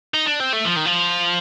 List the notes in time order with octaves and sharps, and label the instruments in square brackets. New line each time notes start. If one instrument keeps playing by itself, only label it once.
[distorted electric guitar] D#4
D4
C4
A3
F3
D#3
F3